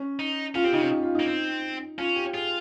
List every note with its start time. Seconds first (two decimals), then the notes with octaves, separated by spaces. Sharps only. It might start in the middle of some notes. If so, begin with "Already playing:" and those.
Already playing: C#4
0.19 D#4
0.55 C#4 F4
0.64 C4 G4
0.73 C#3 D#4
0.82 C3 C#4
0.91 D#4
1.03 F4
1.15 A#3 D#4
1.26 C4
1.98 C#4 F4
2.16 G4
2.34 F4 G#4